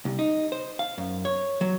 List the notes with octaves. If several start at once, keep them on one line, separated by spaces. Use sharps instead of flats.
C2
D#4
C5
F5
F#2
C#5
F#3